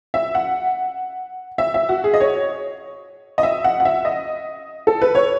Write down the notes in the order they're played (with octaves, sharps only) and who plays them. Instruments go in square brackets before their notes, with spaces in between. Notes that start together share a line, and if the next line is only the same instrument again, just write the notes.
[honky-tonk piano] E5
F#5
E5
E5
F#4
G#4
D#5
C#5
D#5
E5
F#5
F#5
E5
D#5
A4
B4
C#5